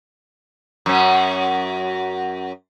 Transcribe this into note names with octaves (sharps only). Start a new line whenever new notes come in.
F#2 C#4